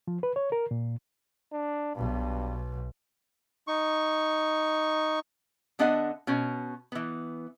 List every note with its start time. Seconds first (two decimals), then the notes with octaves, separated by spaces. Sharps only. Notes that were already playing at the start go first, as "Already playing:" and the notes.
0.08 F3
0.23 B4
0.36 C#5
0.52 A#4
0.71 A#2
1.53 D4
1.95 B1 G2 B2
3.68 D#4 C#6
5.79 D3 B3 D4 D#5 E5 F#5
6.27 B2 C#4
6.92 E3 B3